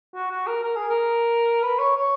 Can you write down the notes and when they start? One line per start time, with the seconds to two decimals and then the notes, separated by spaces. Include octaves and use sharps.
0.14 F#4
0.30 F#4
0.47 A#4
0.63 A#4
0.76 G#4
0.89 A#4
1.63 B4
1.79 C#5
1.96 C#5